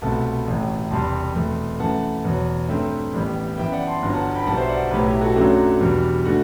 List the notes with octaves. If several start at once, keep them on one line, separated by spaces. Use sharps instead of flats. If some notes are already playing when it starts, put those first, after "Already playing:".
C2 B2 A3 C4 F#5 A5
A1 A2 F#3
E1 E2 C3 G3 A5 C6
E2 B2 A3 C4
F#2 E3 A3 F#5 A5
E2 B2 F#3
G2 F#3 A3 C4 E5 G5
A1 A2 G3 B3
F#2 E3 B3 E5 G5
D5 F#5
A5 C6
G1 G2 F#3 B3
F#5 A5
G5 B5
B1 B2 G3 B3 F#5 A5
C5 E5
D5 F#5
B1 A2 F#3 G4 B4
E4 G4
F#4 A4
F#2 F#3 A3 C4 D4 F#4
E2 B2 G3 B3
D3 A3 D4 F#4